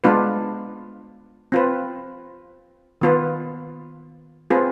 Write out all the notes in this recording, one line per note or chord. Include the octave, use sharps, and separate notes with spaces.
G#3 B3 D4 F4 B4
C4 F4 B4
D#3 B3 F4 B4
C4 F4 G#4 B4